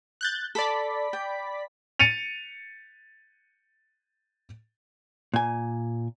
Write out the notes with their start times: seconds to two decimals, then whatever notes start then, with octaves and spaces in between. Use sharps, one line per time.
0.21 F#6 G6 A6
0.55 A4 D5 B5 B6
1.13 G5
1.99 A6 C#7 D#7 F7
5.34 A#2 G#5